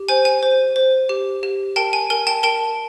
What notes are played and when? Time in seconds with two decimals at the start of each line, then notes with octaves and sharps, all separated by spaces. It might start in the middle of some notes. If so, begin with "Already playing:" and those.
Already playing: G4
0.09 C5 G#5
0.25 G#5
0.43 C5
0.76 C5
1.09 G4
1.43 G4
1.76 A#4 G5 A5
1.93 G#5
2.10 A#4 G#5
2.27 G5 A5
2.43 A#4 G5 A5